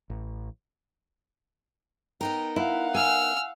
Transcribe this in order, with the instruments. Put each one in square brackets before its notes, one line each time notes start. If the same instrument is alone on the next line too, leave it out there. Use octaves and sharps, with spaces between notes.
[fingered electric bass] A1
[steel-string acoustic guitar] B3 D#4 A#4 [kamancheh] G5
[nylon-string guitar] E4 [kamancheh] F5 F#5
[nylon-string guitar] G#5 [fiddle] E6 F6